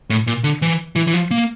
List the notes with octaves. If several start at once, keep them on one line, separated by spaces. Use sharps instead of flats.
A2
A#2
D3
E3
E3
E3
F3
A#3